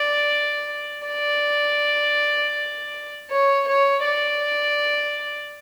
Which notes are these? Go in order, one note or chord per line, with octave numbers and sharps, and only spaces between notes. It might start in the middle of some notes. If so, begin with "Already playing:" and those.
Already playing: D5
D5
C#5
C#5
D5